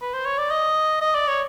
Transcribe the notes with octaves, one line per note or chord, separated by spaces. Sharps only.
B4
C5
C#5
D5
D#5
D#5
D5
C#5